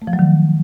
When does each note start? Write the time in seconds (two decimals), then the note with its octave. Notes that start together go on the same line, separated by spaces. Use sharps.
0.02 A3
0.07 F3
0.13 F#3
0.19 D#3